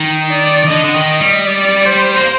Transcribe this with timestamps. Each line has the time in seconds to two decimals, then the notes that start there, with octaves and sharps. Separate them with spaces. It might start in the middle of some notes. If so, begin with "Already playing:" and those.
Already playing: D#3 D#4
0.30 D5
0.69 D3 D#5
0.84 D3
0.95 D#3
1.20 G3
1.47 D5
1.86 C5
2.17 A#3